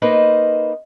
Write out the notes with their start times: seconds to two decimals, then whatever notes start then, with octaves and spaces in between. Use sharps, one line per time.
0.02 A#3 D#4 B4 C5 D#5